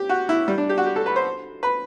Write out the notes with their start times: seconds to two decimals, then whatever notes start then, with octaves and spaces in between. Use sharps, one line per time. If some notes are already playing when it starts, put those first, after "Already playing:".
Already playing: G4
0.09 F#4
0.29 E4
0.48 G3
0.58 D4
0.69 G4
0.78 F#4
0.86 G4
0.96 A4
1.06 B4
1.16 C5
1.63 B4